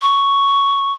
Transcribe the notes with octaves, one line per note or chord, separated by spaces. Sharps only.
C#6